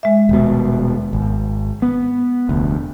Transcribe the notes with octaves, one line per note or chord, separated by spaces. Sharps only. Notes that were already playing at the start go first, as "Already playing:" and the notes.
G#3 E5
D#1 B2
G#1
B3
F1 D2